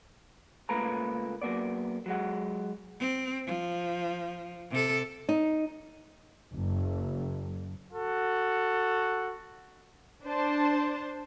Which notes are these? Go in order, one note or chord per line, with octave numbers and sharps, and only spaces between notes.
C#2 A#2 A3 A#3 B4 A#5
F#3 A#3 B3 D5
F#3 G#3 F#5
C4
F3
C3 A4
D#4
F#1
F#4 A4
D4 C5 A5